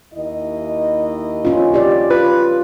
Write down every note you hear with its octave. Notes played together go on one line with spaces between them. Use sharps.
D#2 E4 D#5
C#4 F4
G4 D5
F4 B4